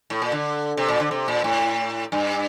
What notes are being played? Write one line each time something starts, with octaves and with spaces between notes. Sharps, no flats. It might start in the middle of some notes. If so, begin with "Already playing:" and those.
A2
A#2
D3
C3
A#2
D3
C3
A#2
A2
G2